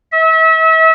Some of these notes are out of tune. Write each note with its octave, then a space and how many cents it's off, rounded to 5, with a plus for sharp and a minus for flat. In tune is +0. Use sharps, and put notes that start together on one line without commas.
E5 -35